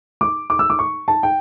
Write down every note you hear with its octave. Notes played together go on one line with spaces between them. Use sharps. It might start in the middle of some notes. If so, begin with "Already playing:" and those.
D6
D6
E6
D6
C#6
A5
G5